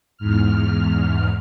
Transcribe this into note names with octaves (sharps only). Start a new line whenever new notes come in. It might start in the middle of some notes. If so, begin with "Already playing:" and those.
E2 G#2 F6